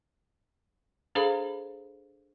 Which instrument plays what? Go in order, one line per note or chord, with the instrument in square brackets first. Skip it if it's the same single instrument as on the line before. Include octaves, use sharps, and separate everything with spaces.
[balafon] D4 G#4 A4 C5 F5 B5